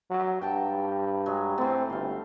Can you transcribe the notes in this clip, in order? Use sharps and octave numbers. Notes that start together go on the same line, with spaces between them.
F#3
G2 G5 A5 A#5
F#3 G#3
E3 A3 C4
G1 C5 F5